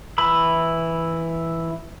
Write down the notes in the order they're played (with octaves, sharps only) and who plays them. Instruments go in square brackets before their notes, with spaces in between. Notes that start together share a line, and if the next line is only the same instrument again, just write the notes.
[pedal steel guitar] E3 E4 B5 E6